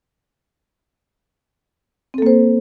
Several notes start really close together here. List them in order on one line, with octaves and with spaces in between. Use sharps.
C4 A4 A#3 C5